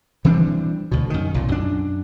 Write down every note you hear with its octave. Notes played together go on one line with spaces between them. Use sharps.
E3 G3 C4 D4
D2 B2
F#2 D#3
B1 A#2
F#2 D4